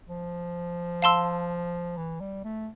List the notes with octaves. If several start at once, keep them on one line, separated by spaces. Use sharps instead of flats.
F3
F5 A5 C6 E6
E3
G3
A3